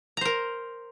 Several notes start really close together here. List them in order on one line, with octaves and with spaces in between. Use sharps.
A#5 C5 A#4